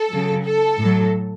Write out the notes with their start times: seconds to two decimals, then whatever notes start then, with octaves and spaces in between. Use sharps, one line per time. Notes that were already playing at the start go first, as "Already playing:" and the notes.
Already playing: A4
0.10 C#3 F#3
0.44 A4
0.79 A2 F#3